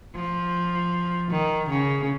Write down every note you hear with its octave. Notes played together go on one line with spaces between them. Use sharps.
F3
D#3
C#3